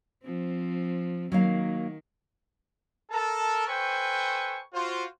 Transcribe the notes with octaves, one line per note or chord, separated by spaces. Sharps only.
F3 C4
D#3 F#3 A#3 F5
A4 A#4 A5
A4 B4 C5 G5 G#5 C#6
F4 F#4 C5